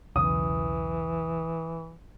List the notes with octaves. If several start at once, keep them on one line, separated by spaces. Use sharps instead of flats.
B1 E2 C#3 E3 D#6